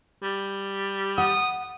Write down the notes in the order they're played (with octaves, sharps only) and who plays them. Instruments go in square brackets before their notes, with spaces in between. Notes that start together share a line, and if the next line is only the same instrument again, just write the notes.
[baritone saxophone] G3
[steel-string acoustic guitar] F#5 [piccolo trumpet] D#6